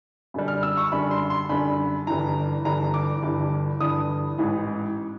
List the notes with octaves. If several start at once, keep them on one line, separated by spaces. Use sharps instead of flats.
F#2 D3 G3
F6
E6
C#6
F#2 D3 G3 B5
C6
C6
F#2 D3 G3 B5
G1 G2 E3 A#5
G1 G2 E3 A#5
D6
G1 G2 E3
G1 G2 E3 D#6
A1 G#2 E3